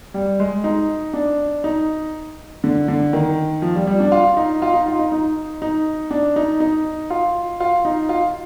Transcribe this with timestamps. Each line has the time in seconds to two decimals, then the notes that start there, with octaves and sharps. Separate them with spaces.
0.14 G3
0.40 G#3
0.64 D#4
1.14 D4
1.64 D#4
2.64 D3
2.88 D3
3.13 D#3
3.62 F3
3.75 G3
3.87 G3
4.00 D4
4.12 F4
4.37 D#4
4.62 F4
4.74 D#4
4.87 F4
4.99 D#4
5.12 D#4
5.62 D#4
6.11 D4
6.36 D#4
6.60 D#4
7.10 F4
7.60 F4
7.85 D#4
8.09 F4